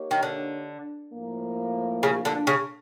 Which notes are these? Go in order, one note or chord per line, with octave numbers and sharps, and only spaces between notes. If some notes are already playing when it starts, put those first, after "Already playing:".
Already playing: A#3 D#4 G4 A#4 C#5
D#3
D3
A2 F3 A#3
C#3
D3
C#3